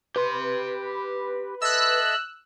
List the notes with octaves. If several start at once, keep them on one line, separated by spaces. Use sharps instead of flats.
G4 B4 C6
A4 D#5 E5 E6 F#6